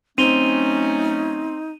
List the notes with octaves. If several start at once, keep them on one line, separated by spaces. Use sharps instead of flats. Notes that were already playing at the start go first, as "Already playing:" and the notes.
F#3 A3 C4 C#4 D#4 D#7 F7 G7